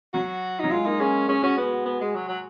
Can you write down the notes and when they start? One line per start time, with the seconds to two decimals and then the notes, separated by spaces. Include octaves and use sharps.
0.14 F#3 F#4
0.60 F#3 D#4
0.71 G#3 F4
0.86 A#3 D#4
1.00 C#4 G#4
1.28 C#4 G#4
1.43 C#4 F#4
1.58 B3 F#4
1.72 F#4
1.86 B3
2.01 G#3
2.15 F#3
2.29 F#3